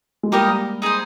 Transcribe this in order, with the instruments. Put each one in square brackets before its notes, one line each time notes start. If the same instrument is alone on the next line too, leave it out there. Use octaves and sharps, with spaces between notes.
[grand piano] G#3
[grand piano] G3 A#3 [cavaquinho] D#4 G4 A#4 D#5
[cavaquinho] D#4 G#4 C5